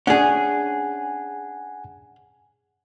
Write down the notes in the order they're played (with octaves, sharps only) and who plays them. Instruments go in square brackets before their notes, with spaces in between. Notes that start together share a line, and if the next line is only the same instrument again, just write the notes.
[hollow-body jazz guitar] C#4 D4 G#4 [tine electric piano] F#5 G#5